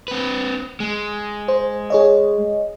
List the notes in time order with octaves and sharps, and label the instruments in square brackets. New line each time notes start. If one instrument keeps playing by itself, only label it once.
[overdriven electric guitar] C4 B4
G#3
[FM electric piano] C5
G#4 C#5 D#5